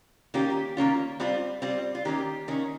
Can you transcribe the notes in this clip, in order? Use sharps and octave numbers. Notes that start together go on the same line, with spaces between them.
D#3 A#3 C#4 F4 G4
D#3 A#3 C#4 F4
G3 C4 F4
G3 C4 F4
F4
D#3 A#3 C#4 G4
D#3 A#3 C#4